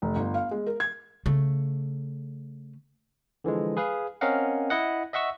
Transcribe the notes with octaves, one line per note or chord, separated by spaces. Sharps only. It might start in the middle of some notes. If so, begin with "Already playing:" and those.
F1
G1
F5
G#3
A#4
G#6
C#3 A3
D3 E3 F3 G#3
G#4 B4 F5
C4 C#4 A#4 D#5 F5 F#5
E4 D#5 F#5
D#5 E5 F#5 C#6 E6